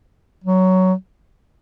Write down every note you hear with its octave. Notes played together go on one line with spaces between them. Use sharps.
F#3